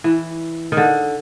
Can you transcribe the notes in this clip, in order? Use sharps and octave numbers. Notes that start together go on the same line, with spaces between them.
E3
D#3
D3